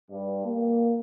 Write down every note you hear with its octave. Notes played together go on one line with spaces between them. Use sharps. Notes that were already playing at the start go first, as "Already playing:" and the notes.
G2
A#3